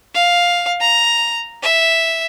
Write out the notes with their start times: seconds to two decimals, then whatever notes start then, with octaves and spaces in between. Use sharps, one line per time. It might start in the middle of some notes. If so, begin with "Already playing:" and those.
0.14 F5
0.80 A#5
1.63 E5